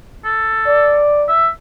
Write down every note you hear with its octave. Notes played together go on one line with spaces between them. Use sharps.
A4
D5
E5